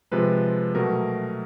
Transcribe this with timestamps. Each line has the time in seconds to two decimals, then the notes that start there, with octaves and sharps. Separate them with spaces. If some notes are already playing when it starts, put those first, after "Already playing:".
0.11 C3 F3 G#3 B4
0.75 B2 F#3 A3 A#4